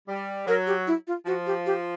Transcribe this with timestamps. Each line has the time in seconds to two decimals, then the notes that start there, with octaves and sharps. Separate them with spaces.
0.09 G3
0.47 F#3 A#4
0.67 G4
0.87 E4
1.07 F4
1.26 F3 F#4
1.47 G4
1.66 G4